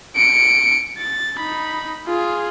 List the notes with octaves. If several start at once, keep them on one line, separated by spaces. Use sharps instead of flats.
C#7 D7
A6
D#4 B5
F4 G#4